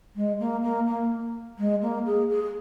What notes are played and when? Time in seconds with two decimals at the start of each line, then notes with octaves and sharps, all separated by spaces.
0.16 G#3
0.40 A#3
0.63 A#3
0.87 A#3
1.59 G#3
1.82 A#3
2.06 G#4
2.30 G#4